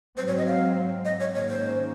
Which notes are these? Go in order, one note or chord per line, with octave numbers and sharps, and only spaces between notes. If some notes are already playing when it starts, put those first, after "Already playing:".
G#2 F#3 C4 C5
C#5
D#5
F5
D#5
C#5
G#2 D#3 A#3 C#4 C#5
C5